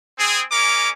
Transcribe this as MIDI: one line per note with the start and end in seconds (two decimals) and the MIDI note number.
0.18 0.43 60
0.18 0.43 68
0.51 0.89 56
0.51 0.89 61
0.51 0.89 70
0.51 0.89 86